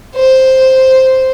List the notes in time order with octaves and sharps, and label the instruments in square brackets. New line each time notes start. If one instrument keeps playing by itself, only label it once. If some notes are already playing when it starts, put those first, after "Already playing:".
[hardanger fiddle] C5